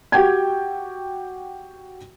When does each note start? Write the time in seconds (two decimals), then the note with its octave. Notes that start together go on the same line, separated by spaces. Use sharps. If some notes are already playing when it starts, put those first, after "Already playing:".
0.12 F#4 G4 G5 G#6